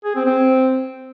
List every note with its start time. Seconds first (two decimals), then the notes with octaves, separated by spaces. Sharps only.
0.05 G#4
0.15 C4
0.26 C4